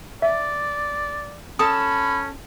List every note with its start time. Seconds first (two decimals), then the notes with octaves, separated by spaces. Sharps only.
0.22 D5 E5
1.59 C#4 A4 A5 B5 D#6